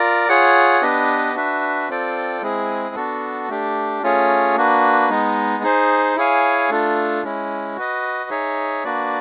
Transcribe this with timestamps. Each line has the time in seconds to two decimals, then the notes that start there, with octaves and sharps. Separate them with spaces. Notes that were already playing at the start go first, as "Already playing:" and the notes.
Already playing: F4 A#4 D5
0.29 F4 G#4 C#5 F#5
0.82 B3 D4 G4 B4 D#5
1.35 D4 F#4 B4 E5
1.89 C4 F4 A4 D5 G5
2.42 G#3 C4 E4 G#4
2.95 B3 D4 F#4 A4
3.49 A3 D4 G4
4.03 A3 C#4 F4 G#4 C#5
4.56 A#3 D4 F#4 B4
5.10 G#3 B3 D#4
5.63 D#4 G#4 C5
6.16 E4 G#4 C#5 F5 G#5
6.69 A3 D4 F4 A4
7.24 G#3 C#4 E4
7.76 F#4 B4 D#5
8.30 D#4 G#4 C#5 E5
8.84 A#3 D4 F#4 B4 D5